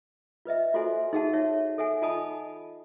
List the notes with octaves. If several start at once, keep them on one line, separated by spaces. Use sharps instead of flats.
F4 B4 D#5 E5
F4 F#4 A4 C5 E5 G#5
D#4 F#4 G#4 E5 F#5 A5
C#5 E5
A4 E5 F#5 G#5
F4 D#5 G#5 A5 B5 D#6